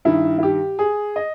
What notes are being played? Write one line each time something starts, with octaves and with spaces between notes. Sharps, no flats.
G2 D#3 E4
E4
G4
G#4
D#5